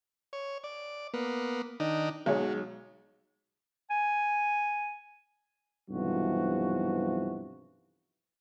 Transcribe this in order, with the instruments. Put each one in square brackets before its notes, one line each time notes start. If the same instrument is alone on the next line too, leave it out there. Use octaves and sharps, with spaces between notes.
[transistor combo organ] C#5
D5
A#3 B3
D#3 D4 D#4
[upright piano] B1 G#3 C#5 [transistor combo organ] F#3
[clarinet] G#5
[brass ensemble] B1 G2 C3 E3 F3 F#4